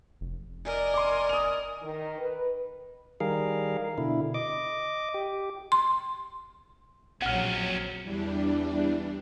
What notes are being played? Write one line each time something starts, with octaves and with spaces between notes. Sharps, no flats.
F1
A#4 D5 D#5 G#5
C6 D6
D#6 F7
D#3
B4
D#3 G3 G#4 A#4 F5
B2 D3 E4
D#5 D6
G4
C6
A#1 C3 F#3 C#4 F#5 F6
E2 E3 G3 D4